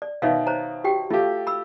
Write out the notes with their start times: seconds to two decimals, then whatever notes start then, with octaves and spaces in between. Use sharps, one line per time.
0.02 D5
0.22 B2 D#3 C#5 E5 F5
0.47 C5 C#5 A#5
0.84 F#4 G4 G5
1.10 A3 F4 G4 F5
1.47 B5 E6